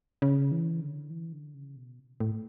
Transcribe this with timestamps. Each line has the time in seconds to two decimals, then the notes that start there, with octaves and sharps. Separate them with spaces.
0.22 C#3
0.51 E3
0.81 D3
1.10 E3
1.33 D3
1.54 C#3
1.76 B2
2.20 A2